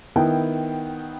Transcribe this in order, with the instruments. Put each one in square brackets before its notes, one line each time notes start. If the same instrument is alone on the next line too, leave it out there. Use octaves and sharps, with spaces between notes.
[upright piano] D#3 B3 E4 G5